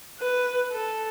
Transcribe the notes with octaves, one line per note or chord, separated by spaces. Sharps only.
B4
A4